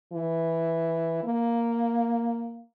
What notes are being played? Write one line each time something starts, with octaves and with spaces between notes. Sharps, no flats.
E3
A#3